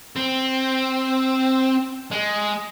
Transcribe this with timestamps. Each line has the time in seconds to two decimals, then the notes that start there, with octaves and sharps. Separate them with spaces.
0.16 C4
2.12 G#3